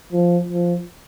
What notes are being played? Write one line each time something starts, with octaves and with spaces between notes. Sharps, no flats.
F3
F3